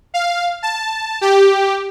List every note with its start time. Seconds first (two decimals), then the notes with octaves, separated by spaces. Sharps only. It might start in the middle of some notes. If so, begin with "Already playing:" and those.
0.14 F5
0.63 A5
1.21 G4